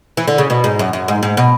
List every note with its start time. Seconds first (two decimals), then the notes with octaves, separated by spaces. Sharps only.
0.17 E3
0.28 D3
0.38 C#3
0.50 B2
0.64 G#2
0.79 F#2
0.93 F#2
1.08 G#2
1.23 G#2
1.37 B2